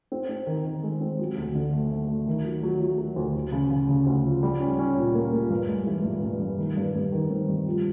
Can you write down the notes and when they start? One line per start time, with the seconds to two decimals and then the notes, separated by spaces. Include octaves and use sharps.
0.12 C4
0.29 C4
0.47 D#3
0.65 D#3
0.83 G#3
1.01 C4
1.19 F#3
1.37 D2
1.55 D3
1.73 A3
1.91 A3
2.08 A3
2.27 D#3
2.45 F#3
2.63 F#3
2.80 F#3
2.98 F#3
3.16 D2
3.35 D2
3.52 C#3
3.71 C#3
3.89 C#3
4.06 D2
4.25 F3
4.43 G3
4.60 C#4
4.79 C#4
4.96 A#2
5.14 A#3
5.32 A#3
5.50 G2
5.68 G#3
5.86 E3
6.04 G2
6.23 G2
6.40 G2
6.58 D#3
6.76 G2
6.94 G2
7.12 D#3
7.30 C4
7.48 G2
7.66 F3